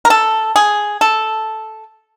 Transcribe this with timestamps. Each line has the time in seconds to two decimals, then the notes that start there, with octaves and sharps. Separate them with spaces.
0.05 A#4
0.10 A4
0.56 G#4
1.01 A4